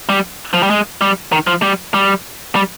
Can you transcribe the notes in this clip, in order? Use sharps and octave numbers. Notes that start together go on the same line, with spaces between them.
G3
F3
G3
G#3
G3
D#3
F3
G3
G3
G3